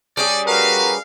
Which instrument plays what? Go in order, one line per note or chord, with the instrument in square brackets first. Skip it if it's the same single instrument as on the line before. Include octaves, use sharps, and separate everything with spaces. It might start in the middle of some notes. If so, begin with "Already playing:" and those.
[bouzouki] G3 C#4 G#4 [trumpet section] D5
[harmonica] F#4 A#4 B4 [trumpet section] F5